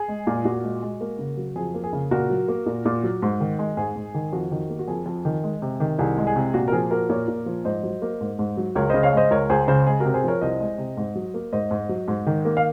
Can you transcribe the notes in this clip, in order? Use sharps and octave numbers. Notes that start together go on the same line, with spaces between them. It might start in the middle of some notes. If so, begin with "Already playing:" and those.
Already playing: G#4
G#3
A#2
A#2 F#4
G#3
G#3
A#3
C#3
F#3
F2 G#4
A#3
G#4
C#3
A#2 F#4 A#4
F#3
A#3
A#2
A#2
F#3
G#2
D#3
G#3
G#2 G#4
G#2
D#3
F2 F#4
D#3
A#3
F#4
F2 G#4
F2
D#3
G#3
C3
D#3
C2 G#4
G#3
G#4
C3
A#2 F#4
A#4
F3 G#4
A#3 F#4 A#4
A#2 A#4 C#5
A#2
F3
G#2 C5 D#5
F#3
A#3
G#2
G#2
F#3
C#2 A#4 C#5
C#3 C5 D#5
C#5 F5
G#3 C5 D#5
C#2 A#4 C#5
C#2 G#4 C5
C#3 G#4 C5
G#3 G#4
C3 F#4 A#4
G#4 C5
F3 A#4 C#5
C2 C5 D#5
G#3
C3
G#2
F#3
A#3
G#2 C5 D#5
G#2
F#3
G#2
D#3
A#3
F5